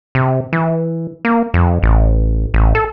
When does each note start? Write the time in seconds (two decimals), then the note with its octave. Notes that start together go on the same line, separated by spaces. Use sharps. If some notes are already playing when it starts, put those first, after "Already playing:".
0.15 C3
0.53 E3
1.25 A#3
1.54 F2
1.83 A1
2.54 A1
2.75 A4